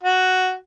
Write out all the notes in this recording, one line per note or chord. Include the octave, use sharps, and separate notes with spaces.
F#4